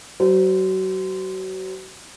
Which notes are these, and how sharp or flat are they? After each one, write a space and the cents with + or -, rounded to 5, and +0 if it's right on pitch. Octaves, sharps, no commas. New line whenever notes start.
F#3 +35 C5 -25